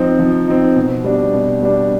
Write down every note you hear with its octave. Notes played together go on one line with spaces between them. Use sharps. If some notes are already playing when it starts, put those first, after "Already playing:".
Already playing: F3 C4 D#4
F3
C4 D#4
B2
G3 D4
B2
G3 D4